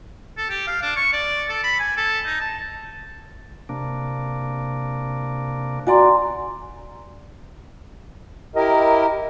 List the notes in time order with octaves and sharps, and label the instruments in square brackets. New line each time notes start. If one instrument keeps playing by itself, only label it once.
[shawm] A4
G4
F5
D4
C#6
D5
A4
B5
G#5
A4
D#4
A5
[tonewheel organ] C3 A#3 D4
[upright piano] F#4 D5 [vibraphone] G#5 A#5 C6
[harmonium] E4 G4 A#4 [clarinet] D#5